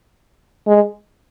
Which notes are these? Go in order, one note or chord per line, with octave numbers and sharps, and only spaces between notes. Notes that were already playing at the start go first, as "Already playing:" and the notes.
G#3